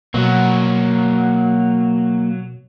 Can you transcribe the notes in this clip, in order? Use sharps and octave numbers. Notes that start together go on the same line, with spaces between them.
B2 F#3 A#3 F#4